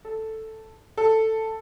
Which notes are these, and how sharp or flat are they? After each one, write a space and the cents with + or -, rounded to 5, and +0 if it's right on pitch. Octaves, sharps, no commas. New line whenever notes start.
A4 +5
A4 +10